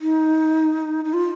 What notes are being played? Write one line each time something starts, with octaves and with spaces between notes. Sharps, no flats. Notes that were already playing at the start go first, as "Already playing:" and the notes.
D#4
D#4
F4